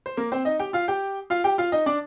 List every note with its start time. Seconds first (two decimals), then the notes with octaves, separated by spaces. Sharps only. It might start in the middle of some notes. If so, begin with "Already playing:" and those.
0.06 C5
0.17 A#3 A#4
0.32 C4 C5
0.45 D#4 D#5
0.59 G4 G5
0.73 F4 F5
0.88 G4 G5
1.30 F4 F5
1.44 G4 G5
1.58 F4 F5
1.72 D#4 D#5
1.86 D4 D5